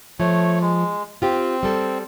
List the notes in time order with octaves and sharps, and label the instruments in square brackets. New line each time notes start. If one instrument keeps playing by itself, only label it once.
[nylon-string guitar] F3 [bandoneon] A3 C#5
[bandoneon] G#3
[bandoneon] C4 [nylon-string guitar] F4 G4
[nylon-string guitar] G3 A4